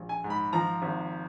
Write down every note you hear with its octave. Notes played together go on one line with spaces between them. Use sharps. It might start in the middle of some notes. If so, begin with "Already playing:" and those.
Already playing: A#1
G#5
G#2
B5
F3 A#5
G#1